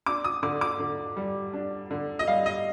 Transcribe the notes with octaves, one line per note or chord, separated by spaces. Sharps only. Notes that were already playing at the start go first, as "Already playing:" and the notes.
D4 D6
D#6
D3 D6
D6
D3
G3
D4
D3
D#5
G3 F5
D#5